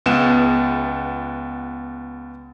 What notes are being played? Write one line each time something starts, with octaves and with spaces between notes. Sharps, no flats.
C#2 B3 E7